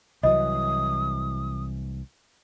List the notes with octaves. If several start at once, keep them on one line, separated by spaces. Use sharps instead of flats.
C2 E3 F#3 D#5 D#6